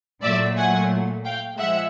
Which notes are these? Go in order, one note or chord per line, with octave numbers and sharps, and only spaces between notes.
A#2 F#3 A3 D5 E5
F#5 G#5
F5 G5
F3 G#3 E5 F#5